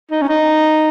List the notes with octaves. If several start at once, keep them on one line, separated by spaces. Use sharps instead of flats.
D#4
C#4
D#4